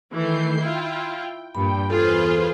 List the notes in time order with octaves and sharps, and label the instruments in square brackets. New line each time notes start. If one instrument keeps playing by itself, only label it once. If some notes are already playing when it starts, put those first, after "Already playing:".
[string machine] D#3 G6 C7 [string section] E3 A3
[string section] E4 F4 [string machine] G5
[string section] G2 A#2 [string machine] G5 [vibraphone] B5
[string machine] E2 C5 C6 [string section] F4 G#4 B4 [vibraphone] A4